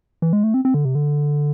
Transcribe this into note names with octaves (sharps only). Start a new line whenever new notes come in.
E3
G#3
A3
C4
C4
D3
C3
D3